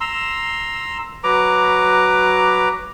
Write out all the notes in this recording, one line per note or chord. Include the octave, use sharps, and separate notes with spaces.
A#5 C6 E6
F#3 B4 A#5 D6